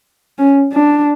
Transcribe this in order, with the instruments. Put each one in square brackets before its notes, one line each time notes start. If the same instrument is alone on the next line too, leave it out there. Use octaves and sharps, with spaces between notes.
[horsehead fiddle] C#4
D4